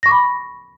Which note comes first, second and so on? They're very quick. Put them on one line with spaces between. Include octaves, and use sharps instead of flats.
A#6 C#6 D6 B5